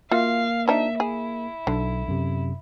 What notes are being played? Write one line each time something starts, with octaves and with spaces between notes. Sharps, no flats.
A#3 F4 F#4 E5 F5
F3 D4 D#4 E5
E4 G#4
B1 D3
F#2 C3